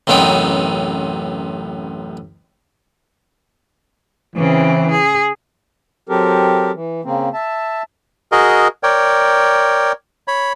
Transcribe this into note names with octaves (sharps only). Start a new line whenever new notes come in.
A1 F#2 C3 B3 D#4 G5
C#3 E3 C4
G#4
F#3 C4 G4 A4 A#4
E3
C#3 A#3 C4
E5 A5
F#4 G#4 A#4 D#5
A#4 C#5 D5 G5
C#5 B5